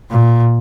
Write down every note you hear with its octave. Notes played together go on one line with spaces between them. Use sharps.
A#2